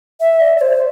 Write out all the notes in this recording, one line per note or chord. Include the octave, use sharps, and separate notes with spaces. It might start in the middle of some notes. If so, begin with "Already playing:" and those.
E5
D5
D5
C5